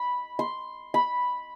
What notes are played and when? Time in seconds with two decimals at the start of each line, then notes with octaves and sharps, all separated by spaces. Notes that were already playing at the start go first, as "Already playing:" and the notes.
Already playing: B5
0.39 C6
0.94 B5